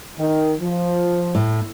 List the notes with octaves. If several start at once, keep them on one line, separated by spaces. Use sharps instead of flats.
D#3
F3
A2